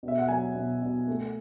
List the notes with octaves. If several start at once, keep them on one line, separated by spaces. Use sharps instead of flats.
B2
E5
F#5
F#3 G#5
B2
B2
A3